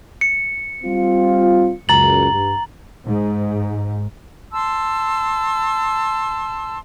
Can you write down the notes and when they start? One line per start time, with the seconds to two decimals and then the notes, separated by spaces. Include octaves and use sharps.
0.21 C#7
0.84 G3 C4 F4
1.89 C#2 F#2 A#5 A6 F#7
2.32 G2
3.06 G#2
4.52 A5 C6 E6